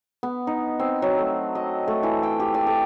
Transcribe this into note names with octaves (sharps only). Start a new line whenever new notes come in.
B3
D#4
C4
F#3
A3
D#5
A3
E3
G5
G4
D5
A4